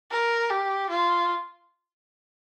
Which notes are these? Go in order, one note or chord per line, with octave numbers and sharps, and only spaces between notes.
A#4
G4
F4